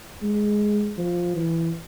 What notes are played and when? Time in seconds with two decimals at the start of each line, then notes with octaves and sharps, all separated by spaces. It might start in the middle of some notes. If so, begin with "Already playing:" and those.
0.22 G#3
0.98 F3
1.36 E3